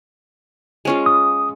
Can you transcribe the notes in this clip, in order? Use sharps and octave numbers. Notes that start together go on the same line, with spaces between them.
G#3 C#4 F4
D#6